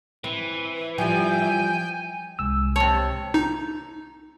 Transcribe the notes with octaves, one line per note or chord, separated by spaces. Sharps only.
E3 C4
F3 G3 G5 G#5 G6
C2 G#3 E6
C3 C#5 A5
D#4